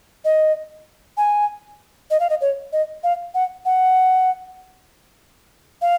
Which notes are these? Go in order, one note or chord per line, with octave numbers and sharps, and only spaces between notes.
D#5
G#5
D#5
F5
D#5
C#5
D#5
F5
F#5
F#5
F5